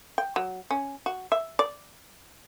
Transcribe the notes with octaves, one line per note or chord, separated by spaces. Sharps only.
G5
F#3
C#4
F#4
E5
D5